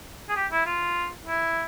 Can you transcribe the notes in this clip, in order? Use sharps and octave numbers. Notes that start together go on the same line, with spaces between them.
G#4
G4
E4
F4
E4